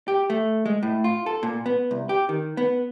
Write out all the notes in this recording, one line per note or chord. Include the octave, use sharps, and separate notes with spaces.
G4
A3
G#3
A2
F4
A4
A#2
B3
C2
G4
D#3
B3